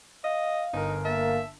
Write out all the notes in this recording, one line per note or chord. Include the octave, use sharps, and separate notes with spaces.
D#5 F5
G1 D#4 A#4
A#3 E5 A5